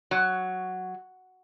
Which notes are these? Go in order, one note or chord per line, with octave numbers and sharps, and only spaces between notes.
F#3